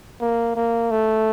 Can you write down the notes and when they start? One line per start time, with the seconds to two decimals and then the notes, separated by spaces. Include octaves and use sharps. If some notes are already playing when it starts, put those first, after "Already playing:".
0.20 A#3
0.56 A#3
0.91 A3